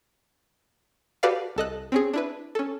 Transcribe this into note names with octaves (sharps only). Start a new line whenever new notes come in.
F#4 G4 A4 B4 D5 F5
C2 A4 D#5 F#6
C4 C#4 G#4
D4 E4 B4
C#4 A4